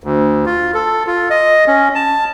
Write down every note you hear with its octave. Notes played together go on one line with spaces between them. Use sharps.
D2
F4
A4
F4
D#5
C#4
A5